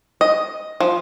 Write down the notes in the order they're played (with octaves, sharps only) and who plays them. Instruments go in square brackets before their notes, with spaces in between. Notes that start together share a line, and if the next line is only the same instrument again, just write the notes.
[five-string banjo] D#5
F3